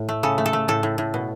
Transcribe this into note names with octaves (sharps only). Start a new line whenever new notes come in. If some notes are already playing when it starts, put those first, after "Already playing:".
Already playing: A2
A3
C#3 A4
A3
A4
A3
A2 A4
A2
A2
B2